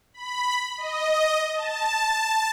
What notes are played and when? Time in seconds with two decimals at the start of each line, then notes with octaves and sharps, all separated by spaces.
0.14 B5
0.78 D#5
1.55 A5